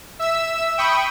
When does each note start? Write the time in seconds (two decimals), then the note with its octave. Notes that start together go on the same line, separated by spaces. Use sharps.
0.19 E5 E6
0.78 G5 B5 C#6 D#6